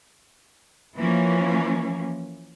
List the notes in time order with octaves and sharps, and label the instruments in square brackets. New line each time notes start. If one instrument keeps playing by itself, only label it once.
[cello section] E3 F3 A#3 C#4